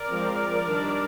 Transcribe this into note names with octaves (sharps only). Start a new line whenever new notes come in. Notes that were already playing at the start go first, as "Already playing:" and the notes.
Already playing: A#4 D5
F3 G#3 C4
D#3 G3 D4